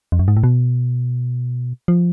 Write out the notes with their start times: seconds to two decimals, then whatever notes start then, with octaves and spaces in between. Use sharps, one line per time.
0.12 F2
0.19 F#2
0.28 G#2
0.37 A2
0.44 B2
1.88 F3